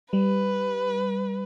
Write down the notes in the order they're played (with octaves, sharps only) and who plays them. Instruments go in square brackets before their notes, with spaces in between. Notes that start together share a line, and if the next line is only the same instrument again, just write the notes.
[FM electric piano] G3 [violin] B4